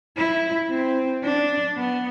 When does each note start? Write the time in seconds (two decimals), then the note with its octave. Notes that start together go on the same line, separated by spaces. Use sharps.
0.17 E4
0.70 C4
1.24 D4
1.77 B3